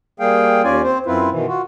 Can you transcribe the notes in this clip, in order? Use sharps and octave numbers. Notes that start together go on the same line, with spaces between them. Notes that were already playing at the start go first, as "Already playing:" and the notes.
G3 A#3 G#4 F5 G5
D#2 C#4 F4 D5 G#5
C4 C5
F#2 C4 E4 F4 B4
B2 D#3 E3
F4 F#4